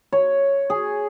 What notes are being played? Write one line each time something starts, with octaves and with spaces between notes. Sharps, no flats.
C#5
G#4